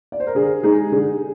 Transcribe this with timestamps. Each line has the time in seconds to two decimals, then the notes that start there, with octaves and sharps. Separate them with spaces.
0.12 D5
0.20 C5
0.27 A#4
0.35 D3 G#4
0.63 G#3 D#4 G#4
0.91 D3 G#4